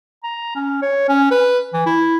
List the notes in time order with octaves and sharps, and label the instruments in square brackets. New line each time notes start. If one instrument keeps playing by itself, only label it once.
[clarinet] A#5
C#4
C#5
C#4
B4
E3
E4